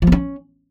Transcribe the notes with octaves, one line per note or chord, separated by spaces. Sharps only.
F3
A#3
C#4